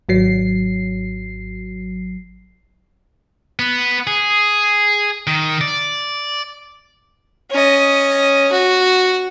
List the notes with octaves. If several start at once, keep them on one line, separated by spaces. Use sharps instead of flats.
G#1 F#3 C7
B3
G#4
D#3
D5
C#4 D#5
F#4